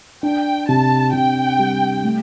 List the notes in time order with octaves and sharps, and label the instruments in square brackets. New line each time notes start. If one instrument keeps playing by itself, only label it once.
[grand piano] D4 [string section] G5
[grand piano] C3 [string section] A5
[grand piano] C3 [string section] G5
[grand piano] G3
A3